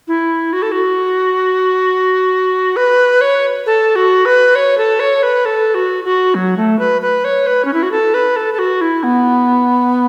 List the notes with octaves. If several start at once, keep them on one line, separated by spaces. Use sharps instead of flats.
E4
F#4
A4
F#4
B4
C#5
A4
F#4
B4
C#5
A4
C#5
B4
A4
F#4
F#4
F#3
A3
B4
B4
C#5
B4
C#4
E4
F#4
A4
B4
A4
A4
F#4
E4
B3